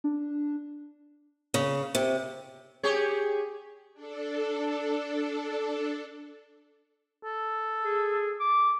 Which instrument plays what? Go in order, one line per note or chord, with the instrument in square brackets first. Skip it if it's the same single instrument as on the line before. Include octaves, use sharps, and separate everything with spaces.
[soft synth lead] D4
[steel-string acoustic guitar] C#3
C3
[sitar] G4 G#4 C#5
[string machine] D4 A4
[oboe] A4
[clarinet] G#4
D6